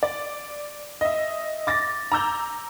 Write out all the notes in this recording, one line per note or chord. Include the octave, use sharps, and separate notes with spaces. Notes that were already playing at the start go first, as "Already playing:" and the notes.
D5
D#5 E5
D6 A6 A#6
A#5 D6 E6 G6